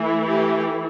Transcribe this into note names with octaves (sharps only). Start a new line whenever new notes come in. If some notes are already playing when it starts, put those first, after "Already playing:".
Already playing: E3 A3 E4
G4